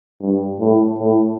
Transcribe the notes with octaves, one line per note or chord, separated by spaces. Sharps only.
G2
A2
A2